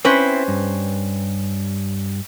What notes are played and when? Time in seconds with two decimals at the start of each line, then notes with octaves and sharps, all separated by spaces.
0.05 C4 C#4 E4 B4 C5
0.48 G2